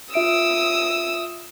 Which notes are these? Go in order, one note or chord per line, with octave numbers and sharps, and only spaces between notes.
F4 E5 D#6 E6 D7